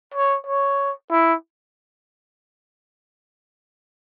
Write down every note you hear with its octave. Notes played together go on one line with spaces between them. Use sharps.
C#5
C#5
E4